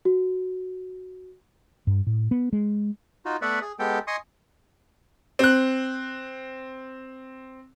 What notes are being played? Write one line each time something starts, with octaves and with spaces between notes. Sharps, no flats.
F#4
G2
A2
B3
G#3
D#4 F4 F#4
A3 B3 B4 D5 E5 F#5
G#4
G#3 B3 G4 A4 G5
D#5 G#5 C6 C#6 D#6
C4 F#6